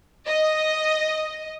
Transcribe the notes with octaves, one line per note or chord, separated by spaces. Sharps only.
D#5